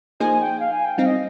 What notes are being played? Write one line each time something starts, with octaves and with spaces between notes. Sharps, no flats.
F3 A#3 D#4 G#4 C5 G#5
G5
F5
G#5
G5
G3 C4 D#4 F5
D#5